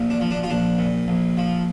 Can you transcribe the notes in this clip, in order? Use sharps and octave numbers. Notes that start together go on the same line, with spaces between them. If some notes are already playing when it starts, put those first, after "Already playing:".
Already playing: A#1 A#2
D4
F3
D4
F4
A#1 D4
A#2
A#1
F3